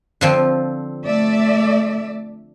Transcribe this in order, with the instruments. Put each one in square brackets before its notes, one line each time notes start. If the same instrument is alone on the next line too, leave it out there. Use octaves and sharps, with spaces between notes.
[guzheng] D3 F3 C4
[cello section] A3 D5 E5